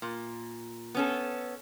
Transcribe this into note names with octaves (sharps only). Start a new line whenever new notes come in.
A#2
B3 C#4 A4